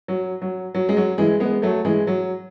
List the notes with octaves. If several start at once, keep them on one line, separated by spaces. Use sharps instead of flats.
F#3
F#3
F#3
G#3
F#3
E3 G#3
G#3 B3
F#3 A3
E3 G#3
F#3